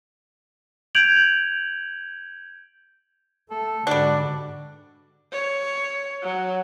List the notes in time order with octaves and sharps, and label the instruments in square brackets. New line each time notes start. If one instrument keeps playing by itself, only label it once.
[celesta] G6 G#6 D7 F7 F#7
[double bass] A3 [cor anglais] A4
[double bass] G#2 D3 [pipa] G3 D4 [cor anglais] F#4
[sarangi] C#5
F#3